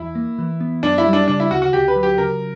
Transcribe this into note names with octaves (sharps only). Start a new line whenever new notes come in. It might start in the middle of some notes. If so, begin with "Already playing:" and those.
Already playing: E2 E4
A#3
E3
B3
F#2 D4
E4
G3
D4
C#3 D4
E4
D2 F#4
F#4
D2 G4
B4
F#3
G4
C#3 A#4